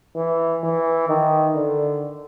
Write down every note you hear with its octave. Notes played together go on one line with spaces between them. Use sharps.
E3
E3
D#3
D3